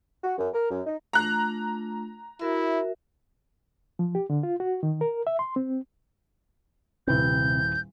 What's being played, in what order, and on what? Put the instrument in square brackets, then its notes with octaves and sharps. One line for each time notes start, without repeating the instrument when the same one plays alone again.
[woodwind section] F#4
F#2
A#4
F#2
D#4
[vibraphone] A3 D4 F4 [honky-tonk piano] A#5 F#6
[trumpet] E4 [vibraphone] F#4 A#4 E5
[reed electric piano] F3
G4
D3
F4
F#4
D#3
A#4
E5
C6
C4
[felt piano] D#1 E4 B4 [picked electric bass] C3 C4 [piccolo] G6